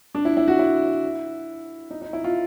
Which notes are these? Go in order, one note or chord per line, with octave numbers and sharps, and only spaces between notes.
D4
E4
E4
F#4
E4
D#4
D#4
E4
F4